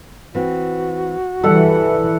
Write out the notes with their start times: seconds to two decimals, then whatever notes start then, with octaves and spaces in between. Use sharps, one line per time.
0.35 E3 C4 F#4
1.44 E3 G3 A4 F#5